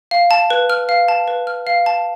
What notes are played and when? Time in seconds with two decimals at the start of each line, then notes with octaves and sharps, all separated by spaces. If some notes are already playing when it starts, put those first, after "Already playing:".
0.11 F5
0.31 A5
0.50 B4
0.70 F6
0.89 F5
1.08 A5
1.28 B4
1.47 F6
1.67 F5
1.86 A5